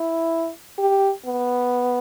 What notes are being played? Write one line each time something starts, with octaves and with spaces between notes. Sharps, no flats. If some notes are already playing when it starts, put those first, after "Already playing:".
Already playing: E4
G4
B3